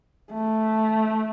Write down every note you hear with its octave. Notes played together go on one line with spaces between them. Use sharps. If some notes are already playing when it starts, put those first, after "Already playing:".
A3